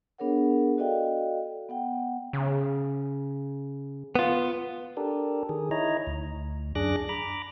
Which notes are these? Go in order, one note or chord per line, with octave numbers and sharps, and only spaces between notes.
B3 D4 G#4 A#4 C#5 F#5
F#4 A4 D5 D#5 F5 G5
B3 F#5 G5
C#3
B3 F4
D4 G4 A4 A#4
D#3 G#4
D#4 E4 C#5 D#5 A#5
D2
F#2 D4 G#4 D6 F#6 A#6
A#5 B5 D6